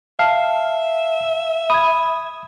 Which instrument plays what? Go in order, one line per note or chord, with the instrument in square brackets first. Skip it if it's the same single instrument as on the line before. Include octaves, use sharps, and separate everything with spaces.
[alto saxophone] E5 [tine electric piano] F5 [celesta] A5
[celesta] B5 G#6 [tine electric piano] D#6